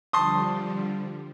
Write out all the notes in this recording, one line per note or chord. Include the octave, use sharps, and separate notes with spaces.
D3 F3 G3 A5 C6 D#6